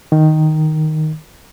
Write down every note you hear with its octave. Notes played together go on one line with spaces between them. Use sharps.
D#3